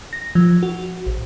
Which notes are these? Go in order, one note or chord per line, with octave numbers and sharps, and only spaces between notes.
A#6
F3
F#4
A1